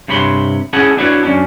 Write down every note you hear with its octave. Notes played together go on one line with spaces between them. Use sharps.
G2 C3 C#5 B5 C6
C#4 E4 G#4 A4 F#5
B3 D4 E4 F#4 B4 C#5
F#2 C#4 D4